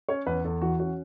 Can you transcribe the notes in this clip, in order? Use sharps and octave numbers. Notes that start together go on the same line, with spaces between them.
C#4 C#5
E2 B4
E2 A4
E3 F#4
C#4 F#4